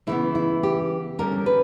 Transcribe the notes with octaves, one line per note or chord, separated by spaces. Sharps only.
C#3 E3 B3 E4
E4
G4
D3 G3 C#4 A#4
B4